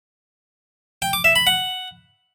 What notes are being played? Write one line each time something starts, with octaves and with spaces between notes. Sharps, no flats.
G5
D6
E5
B5
F#5